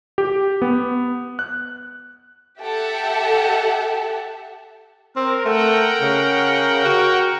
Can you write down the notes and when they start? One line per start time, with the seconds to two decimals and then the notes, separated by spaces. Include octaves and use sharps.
0.18 G4
0.62 B3
1.39 F#6
2.61 G4 A4 E5 F#5 A5
5.16 C4 A#4
5.45 A3 A#4 F#5 G5
6.02 C#3
6.85 F#4